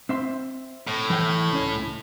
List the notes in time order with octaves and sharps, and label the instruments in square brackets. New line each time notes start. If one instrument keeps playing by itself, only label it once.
[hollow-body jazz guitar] C4 E5 C6
[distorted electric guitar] A2
[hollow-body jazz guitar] E3 G5
C#2 C#4 C#5